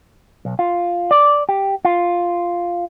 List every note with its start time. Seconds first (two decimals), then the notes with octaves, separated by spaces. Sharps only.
0.45 B1
0.59 F4
1.11 D5
1.49 G4
1.85 F4